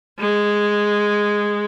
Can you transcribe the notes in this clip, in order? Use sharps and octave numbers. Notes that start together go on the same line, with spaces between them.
G#3